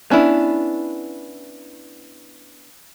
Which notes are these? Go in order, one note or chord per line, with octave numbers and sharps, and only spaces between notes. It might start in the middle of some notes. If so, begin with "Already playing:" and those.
B3 C#4 D4 E4